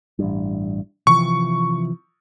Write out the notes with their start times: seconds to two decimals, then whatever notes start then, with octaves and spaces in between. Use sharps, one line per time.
0.19 A1 G2
1.07 C3 E3 F3 C#6